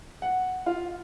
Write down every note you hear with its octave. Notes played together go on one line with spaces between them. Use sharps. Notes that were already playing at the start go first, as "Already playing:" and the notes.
F#5
F4